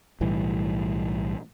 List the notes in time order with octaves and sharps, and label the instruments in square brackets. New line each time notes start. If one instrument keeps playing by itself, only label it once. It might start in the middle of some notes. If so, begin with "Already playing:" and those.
[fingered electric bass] B1 A2 E3 G3